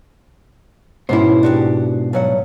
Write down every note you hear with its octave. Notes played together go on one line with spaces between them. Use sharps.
G#2 B2 B3 C#4 E4 C5
D4 F#4 G4
G2 F#3 F#5